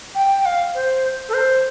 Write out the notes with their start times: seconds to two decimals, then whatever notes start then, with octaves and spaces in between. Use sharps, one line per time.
0.15 G5
0.45 F5
0.75 C5
1.29 A4
1.34 C5